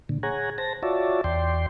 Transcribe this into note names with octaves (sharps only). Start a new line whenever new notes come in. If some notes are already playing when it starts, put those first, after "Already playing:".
A#2 D3
G#4 C#5 F#5 G#5 A#5
C5 A5 A#6
F4 F#4 C#5 D5 E5 A5
E2 D5 G5 C6